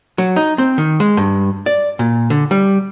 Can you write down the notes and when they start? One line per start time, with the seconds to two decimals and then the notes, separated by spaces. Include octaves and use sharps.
0.18 F#3
0.36 D#4
0.58 C4
0.78 D#3
1.00 G#3
1.17 G2
1.66 D5
1.99 A#2
2.30 D3
2.51 G3